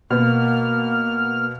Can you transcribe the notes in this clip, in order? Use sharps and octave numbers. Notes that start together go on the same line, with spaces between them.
B2 A#3 B3 F6